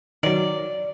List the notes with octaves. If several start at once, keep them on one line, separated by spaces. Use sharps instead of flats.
D#3 F#3 D5